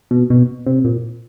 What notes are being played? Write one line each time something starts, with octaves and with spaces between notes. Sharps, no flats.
B2
B2
C3
A#2